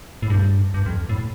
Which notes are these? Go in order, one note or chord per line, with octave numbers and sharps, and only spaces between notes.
A2
G2
G2
F2
A2